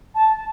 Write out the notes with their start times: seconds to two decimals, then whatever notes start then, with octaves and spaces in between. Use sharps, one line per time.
0.15 A5